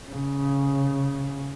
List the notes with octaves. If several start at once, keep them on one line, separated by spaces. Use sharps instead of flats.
C#3